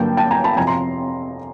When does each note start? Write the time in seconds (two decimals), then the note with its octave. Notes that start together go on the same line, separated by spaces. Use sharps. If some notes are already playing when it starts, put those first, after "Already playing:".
Already playing: G2 D3 F#3 A#3 G5 A5
0.17 G5 A5
0.31 G#5 A#5
0.44 A5 B5
0.57 F2 C3 F3 G#5 A#5
0.67 A#5 C6